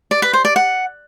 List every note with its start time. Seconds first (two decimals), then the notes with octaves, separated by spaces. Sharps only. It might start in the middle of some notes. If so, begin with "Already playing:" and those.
0.11 D5
0.22 B4
0.33 C5
0.45 D5
0.56 F#5